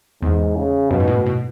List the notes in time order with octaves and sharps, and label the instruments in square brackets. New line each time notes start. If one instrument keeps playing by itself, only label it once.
[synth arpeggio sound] E2 [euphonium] G#2
[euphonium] C#3
[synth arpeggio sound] F#2 [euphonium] B2
[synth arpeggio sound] G#2
A2
B2